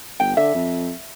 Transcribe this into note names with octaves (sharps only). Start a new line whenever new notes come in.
G1 G5
D3 E5
F2